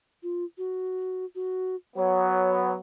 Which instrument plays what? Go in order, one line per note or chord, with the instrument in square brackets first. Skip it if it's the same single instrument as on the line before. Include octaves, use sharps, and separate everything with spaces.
[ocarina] F4
F#4
F#4
[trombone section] F#3 B3 [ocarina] C#5